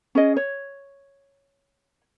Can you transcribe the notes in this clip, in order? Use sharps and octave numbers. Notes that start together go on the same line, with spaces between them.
C#4 G#4 D#5
C#5